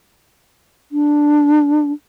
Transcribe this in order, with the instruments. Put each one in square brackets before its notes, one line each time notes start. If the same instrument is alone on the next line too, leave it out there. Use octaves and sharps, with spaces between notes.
[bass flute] D4